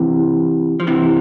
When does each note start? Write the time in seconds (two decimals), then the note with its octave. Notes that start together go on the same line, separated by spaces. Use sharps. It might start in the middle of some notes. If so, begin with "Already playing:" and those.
Already playing: C3 E3
0.80 F3
0.87 C3 E3